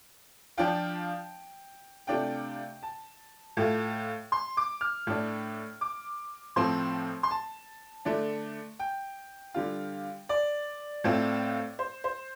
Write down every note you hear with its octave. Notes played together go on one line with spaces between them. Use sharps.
F3 D4 F4 G5
C3 A3 D4 F4 G5
A5
A2 A3 F4
C6
D6
F6
A2 A3 D4
D6
A2 F3 C4 C6
C6
A5
D3 A3 D4
G5
D3 G3 F4
D5
A2 A3 C4 F4
C5
C5